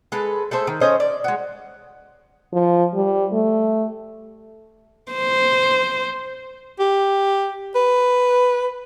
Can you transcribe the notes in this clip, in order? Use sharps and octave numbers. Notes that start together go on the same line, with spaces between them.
G#3 A4 B4
A3 G#4 A4 C5
D#3
A3 C#4 C5 D#5
D5
G#3 F#4
F3
G3
A3
C5
G4
B4